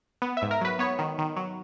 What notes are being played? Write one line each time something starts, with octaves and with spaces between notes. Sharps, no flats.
B3
E5
G#2
A#4
F#3 B4
B3 C#5
D#3
D#3
F#3